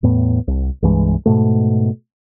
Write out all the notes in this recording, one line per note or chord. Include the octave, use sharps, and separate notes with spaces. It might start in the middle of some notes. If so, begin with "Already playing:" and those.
E2 A2 B3
C2
C2 G2 E3 G#3
G#2 B2 A3